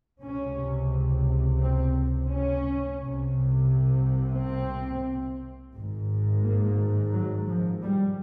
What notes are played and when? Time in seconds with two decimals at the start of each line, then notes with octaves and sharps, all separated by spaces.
0.22 C#2 C3 C#4
1.60 C4
2.29 C#4
2.99 C2 C3
4.37 C4
5.74 G#1 G#2
6.44 A#3
7.13 F#3
7.48 F3
7.82 G3